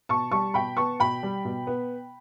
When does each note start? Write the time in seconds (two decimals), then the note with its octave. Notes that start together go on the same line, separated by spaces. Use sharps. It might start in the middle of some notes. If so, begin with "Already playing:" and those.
0.09 B2 A5 C#6
0.32 G3 A5 C#6
0.54 B2 G5 B5
0.77 B3 A5 C#6
1.00 B2 G5 B5
1.23 G3
1.45 B2
1.67 B3